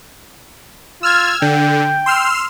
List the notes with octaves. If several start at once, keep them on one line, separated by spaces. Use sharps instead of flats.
F4 E6 F6 G#6
D3 G5
C6 E6 F6